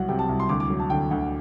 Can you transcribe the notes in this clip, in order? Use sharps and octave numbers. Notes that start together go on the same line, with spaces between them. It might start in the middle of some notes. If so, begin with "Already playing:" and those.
Already playing: C2 F#3 F#5
C3 G5
A5
C2
C6
D2 D6
D6
F#3
A5
D3 G5
D2 F#5